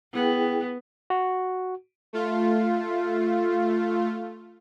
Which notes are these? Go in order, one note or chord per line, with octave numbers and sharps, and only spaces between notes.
B3 E4 G#4 G5
F#4
A3 F4